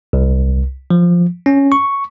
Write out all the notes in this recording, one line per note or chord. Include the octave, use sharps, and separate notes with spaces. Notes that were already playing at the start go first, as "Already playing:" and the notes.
C2
F3
C#4
C#6